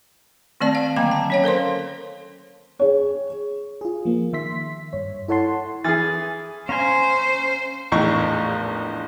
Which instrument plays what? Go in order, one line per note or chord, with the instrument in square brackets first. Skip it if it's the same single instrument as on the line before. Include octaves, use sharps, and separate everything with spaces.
[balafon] D#3 A3 C4 D5 A5
F5
D3 F#3 A#3 G5 A#5
A5
C#4 C#5 F5
A4 A#4 C5 C6
[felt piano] G#4 C#5
[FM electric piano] F4 G#4
F3 A#3
D#3 E5 C6 B6
G2 C#5
E4 A4 C#5 F#5 A5 C6
[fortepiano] E3 G#4 [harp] F6 A6
[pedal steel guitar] C#4 G#5 [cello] C5 [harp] F5 A#5 C6
[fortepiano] A#1 E2 A2 D#4 C#6